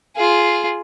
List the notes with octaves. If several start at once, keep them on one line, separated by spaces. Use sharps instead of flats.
F4 G#4